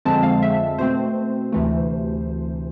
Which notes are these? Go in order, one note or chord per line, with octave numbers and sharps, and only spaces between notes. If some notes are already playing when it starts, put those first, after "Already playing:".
F2 D3 F3 G#3 C4 A5
F5
E5
B2 A3 C4 C5
D2 C3 E3 A3